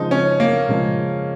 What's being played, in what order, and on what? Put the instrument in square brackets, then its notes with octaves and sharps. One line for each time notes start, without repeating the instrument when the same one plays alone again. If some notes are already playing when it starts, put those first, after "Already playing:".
Already playing: [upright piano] C#3 F3 G#3 [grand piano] D#4
[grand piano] C#4
A#3
[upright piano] C#3 F3 G#3